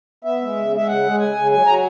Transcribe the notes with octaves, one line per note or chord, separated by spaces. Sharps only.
B3 E5
G#3
C#3
G#3 E5
C#3 F#5
G#3
C#3 G#5
C#3
F#3 G#5
F#3 A#5